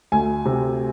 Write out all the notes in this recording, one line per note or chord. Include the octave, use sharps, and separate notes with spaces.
D2 G#5
C3